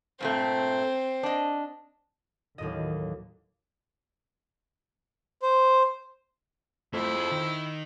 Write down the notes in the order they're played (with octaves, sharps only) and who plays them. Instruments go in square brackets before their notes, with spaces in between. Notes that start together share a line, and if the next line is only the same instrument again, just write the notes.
[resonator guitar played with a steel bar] G2 A#2 A3 [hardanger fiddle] C4 C5
[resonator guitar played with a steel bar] D4 D#5
[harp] D#2 A2 D#5 [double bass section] D#3 E3 F#3
[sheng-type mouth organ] C5
[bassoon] F2 [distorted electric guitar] A3 A#3 [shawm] E4
[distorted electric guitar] G#4 A4
D#3